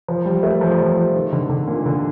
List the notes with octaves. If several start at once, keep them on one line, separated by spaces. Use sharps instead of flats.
F3
G3
A3
F3
F3
D#3
D3
D3
A#2
D3